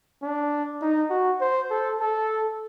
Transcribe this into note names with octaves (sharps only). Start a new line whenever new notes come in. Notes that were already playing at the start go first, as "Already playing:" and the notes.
D4
D#4
F#4
C5
A4
A4